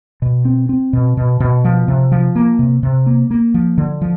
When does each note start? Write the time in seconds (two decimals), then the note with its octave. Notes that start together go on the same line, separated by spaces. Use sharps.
0.22 B2
0.45 C4
0.69 C4
0.93 B2
1.17 B2
1.40 B2
1.64 F3
1.88 C3
2.12 F3
2.35 A#3
2.59 C3
2.83 C3
3.06 A#3
3.31 A#3
3.54 F3
3.78 D3
4.02 F3